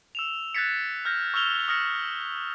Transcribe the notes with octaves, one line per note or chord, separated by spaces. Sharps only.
E6 E7 F7
F#6 G#6 A6 B6 C#7
F6 G6 A#6
C#6 E6 F6 F7 G7
D#6 F6 A#6 C#7